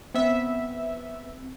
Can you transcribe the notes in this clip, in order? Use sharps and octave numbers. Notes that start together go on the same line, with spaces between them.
B3 C4 E5